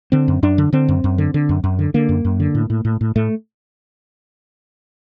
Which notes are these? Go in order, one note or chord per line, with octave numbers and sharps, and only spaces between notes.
D3 C4
F#2
F#2 D4
D3
D3 C4
F#2
F#2
D3
D3
F#2
F#2
D3
D3 A#3
F#2
F#2
D3
A2
A2
A2
A2
A2 A3